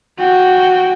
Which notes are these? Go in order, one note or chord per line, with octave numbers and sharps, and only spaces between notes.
F#4 G5